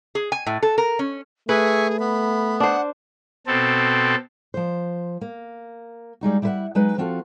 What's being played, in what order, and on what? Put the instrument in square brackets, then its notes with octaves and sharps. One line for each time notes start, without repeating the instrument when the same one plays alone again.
[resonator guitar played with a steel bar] G#4
G#5
A2
A4
A#4
C#4
[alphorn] A3 [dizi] G#4 [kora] B4 [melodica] E5 G#5 C#6
[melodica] B3 [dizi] B5
[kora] D4 C5 [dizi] F#5
[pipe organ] B2 C4 A4
[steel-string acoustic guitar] F3 C5
A#3
G3 G#3 D#4 F#4
G3 E4 G#4 B4 E5 F#5
F#3 G#3 D#4 B4
F3 C4 F4 F#4 A4